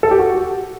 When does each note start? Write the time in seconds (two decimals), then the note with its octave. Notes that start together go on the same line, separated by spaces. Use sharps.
0.03 A4
0.11 G4
0.19 F#4